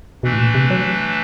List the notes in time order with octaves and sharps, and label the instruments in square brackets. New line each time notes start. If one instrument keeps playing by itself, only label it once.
[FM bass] B2 [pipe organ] E3 A3 D4
[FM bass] A2
A#2
C3
F#3